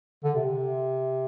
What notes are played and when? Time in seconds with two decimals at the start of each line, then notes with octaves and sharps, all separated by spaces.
0.24 D3
0.35 C3